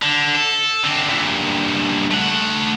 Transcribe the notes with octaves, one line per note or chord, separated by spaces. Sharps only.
D3
A4
D3 C4
G2 A#2
A3 F#5